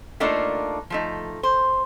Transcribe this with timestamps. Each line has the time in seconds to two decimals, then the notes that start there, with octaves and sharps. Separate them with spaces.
0.20 A3 A#3 D4 D#4 F4
0.90 F3 A3 D#4
1.43 C5